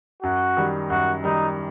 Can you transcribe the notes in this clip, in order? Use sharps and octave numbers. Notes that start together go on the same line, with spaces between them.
F#2 F#4
D#3 G3
F#2 F#4
D#3 G3 D#4